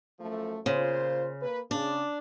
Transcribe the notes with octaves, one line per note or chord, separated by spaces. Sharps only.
F#2 F3 A3
A#2 C#3 F4 C5
A#3 B4
C#3 D4